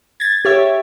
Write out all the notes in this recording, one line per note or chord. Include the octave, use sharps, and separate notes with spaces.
G#6 A6
G4 C#5 E5